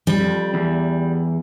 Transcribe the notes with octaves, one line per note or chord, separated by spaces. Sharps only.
G3
F2
E2